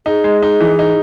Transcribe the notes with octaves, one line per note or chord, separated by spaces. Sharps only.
D#4 G#4
G#3
D#4
E3
D#4